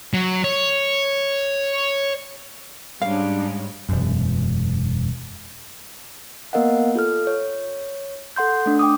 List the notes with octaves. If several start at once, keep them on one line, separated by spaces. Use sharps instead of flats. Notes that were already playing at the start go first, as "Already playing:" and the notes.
F#3
C#5
G#2 G3 G#3 C#4 D4 F5
E1 F#2
A#3 B3 A#4 D#5 F5 F#5
F4 A4 F6
C#5
A4 F#5 C6 G6
A3 D4
G5 D6 D#6